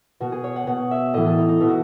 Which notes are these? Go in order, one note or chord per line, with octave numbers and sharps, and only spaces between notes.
B2 F#4
G#4
C#5
F#5
B2 F#5
E5
A2 E3 D#5
A4
D#4
D#4
B2 E4
F#4